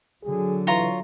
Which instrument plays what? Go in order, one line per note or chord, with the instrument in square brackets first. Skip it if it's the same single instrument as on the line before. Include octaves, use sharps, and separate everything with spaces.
[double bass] D3 F#3 [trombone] G#4
[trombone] E3 [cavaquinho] F4 C#5 A#5